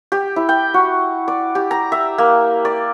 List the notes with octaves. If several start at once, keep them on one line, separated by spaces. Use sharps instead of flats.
G4
E4
G5
F#4
D5
G4
A#5
E5
A#3
D5